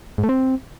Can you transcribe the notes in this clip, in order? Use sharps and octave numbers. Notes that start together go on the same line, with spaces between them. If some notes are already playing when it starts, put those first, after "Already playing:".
G#2
A3
C4